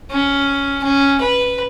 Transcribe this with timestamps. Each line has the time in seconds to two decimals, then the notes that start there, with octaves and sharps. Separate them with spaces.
0.10 C#4
0.84 C#4
1.21 B4